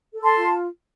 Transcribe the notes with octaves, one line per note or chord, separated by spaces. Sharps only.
A4
A5 C6
F4